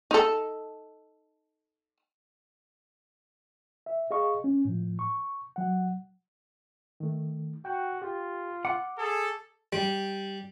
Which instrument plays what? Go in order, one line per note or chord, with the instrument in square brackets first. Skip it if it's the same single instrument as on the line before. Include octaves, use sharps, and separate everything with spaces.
[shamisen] D#4 A4
[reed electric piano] E5
G#4 D#5 F5 C#6
C#4
A2 F3
C#6
F#3 F#5
D#3 A3
[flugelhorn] F#4 [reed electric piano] G5
[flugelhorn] F4 [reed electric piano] G4
[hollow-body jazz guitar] F#5 [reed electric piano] D6
[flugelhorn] G#4 [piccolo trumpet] A4
[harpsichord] G3